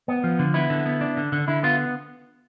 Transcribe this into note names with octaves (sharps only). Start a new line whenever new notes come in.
B3
F3
D3
B3 E4
D3
B3
D4
D3
D3
D3 E4
B3 F4